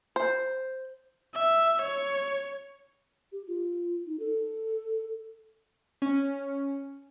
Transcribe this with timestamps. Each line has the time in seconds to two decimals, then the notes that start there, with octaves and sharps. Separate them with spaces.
0.16 C5
1.34 E5
1.83 C#5
3.32 G4
3.48 F4
4.07 D#4
4.20 A4
6.02 C#4